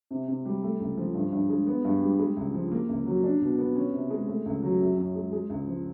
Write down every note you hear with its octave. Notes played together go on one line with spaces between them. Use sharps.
C3
C3
G3
A3
C#2
F3
G2
G2
G#3
B3
G2
G3
G#3
C#2
F3
A#3
C#2
F#3
D4
B2
B3
C#4
C3
G#3
A3
C#2
F#3
F#2
F#2
G#3
G#3
C#2
F3